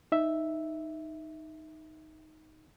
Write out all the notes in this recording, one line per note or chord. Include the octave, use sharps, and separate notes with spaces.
D#4 E5